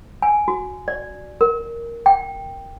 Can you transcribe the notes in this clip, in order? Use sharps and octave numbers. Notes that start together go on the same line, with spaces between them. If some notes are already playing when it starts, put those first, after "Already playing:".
G#5
F#4
D5
A#4
G5